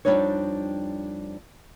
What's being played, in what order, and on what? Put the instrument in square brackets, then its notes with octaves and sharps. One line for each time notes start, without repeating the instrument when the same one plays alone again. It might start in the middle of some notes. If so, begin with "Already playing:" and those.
[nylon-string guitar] F2 F3 G3 D4 D#4 C#5